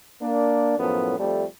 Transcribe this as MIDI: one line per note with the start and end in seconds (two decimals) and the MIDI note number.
0.21 0.78 58
0.21 0.78 62
0.78 1.15 42
0.78 1.15 45
0.78 1.15 53
0.78 1.15 59
1.19 1.44 41
1.19 1.44 55
1.19 1.44 57